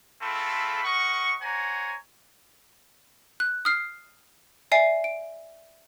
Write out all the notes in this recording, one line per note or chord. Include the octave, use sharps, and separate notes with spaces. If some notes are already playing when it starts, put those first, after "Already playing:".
G#3 A3 C4 F4 A4 B5
A#4 D#5 F#5 C#6
C5 C#5 F#5 G#5 A#5
F#6
D#6 F6 C7
D5 E5 G#5 C7
D7